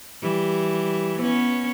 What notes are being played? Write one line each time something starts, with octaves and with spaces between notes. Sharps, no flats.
E3 G3
B3 C#4